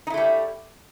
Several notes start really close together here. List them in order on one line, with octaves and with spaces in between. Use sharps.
D#4 E4 A3 G3